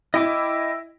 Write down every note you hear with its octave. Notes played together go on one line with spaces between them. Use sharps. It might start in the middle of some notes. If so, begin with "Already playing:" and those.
E4 D#5 G5 D6